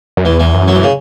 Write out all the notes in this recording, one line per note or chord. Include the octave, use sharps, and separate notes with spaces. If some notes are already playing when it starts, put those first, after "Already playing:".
F#2
E2 E3
E3
F#2
F#3
E3
C#3